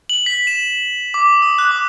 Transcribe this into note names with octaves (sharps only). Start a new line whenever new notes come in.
F#7
B6
E7
D6
D#6
F#6
D6